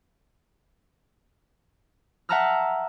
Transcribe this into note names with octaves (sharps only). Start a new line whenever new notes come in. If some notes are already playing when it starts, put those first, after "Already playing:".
E5 F#5 A5 A#5 E6 F6